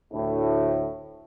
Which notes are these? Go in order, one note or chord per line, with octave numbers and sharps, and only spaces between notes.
D2 A2